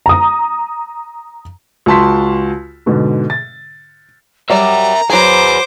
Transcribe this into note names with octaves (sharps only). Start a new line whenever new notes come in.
A#5 D#6
C#2 F#4 A5 C6 B6
G#2 B2 D3
A6
F#3 G3 A#4 D5 E5 A#5
F#3 G#4 B4 C5 G#5 D6